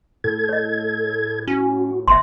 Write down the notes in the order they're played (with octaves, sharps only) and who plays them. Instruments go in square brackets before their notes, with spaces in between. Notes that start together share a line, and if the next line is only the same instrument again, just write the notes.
[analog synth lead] A2 [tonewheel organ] A4 G#6
[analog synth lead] A2 [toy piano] C#5 D#5
[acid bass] C#4 [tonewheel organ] F#4
[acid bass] G1 [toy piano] E5 C6